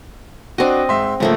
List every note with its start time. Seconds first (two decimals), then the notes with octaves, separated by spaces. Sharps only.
0.58 C4 D4 F#4 D#5
0.89 G#2 E5 C6
1.20 G#2 C#3 F3 A3 A#3